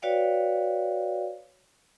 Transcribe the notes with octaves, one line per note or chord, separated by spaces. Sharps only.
F#4 B4 C#5 D5 F5 G5